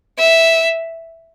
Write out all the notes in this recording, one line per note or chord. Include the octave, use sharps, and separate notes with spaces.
E5